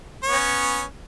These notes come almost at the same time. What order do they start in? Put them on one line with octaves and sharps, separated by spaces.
C#5 B3 C#4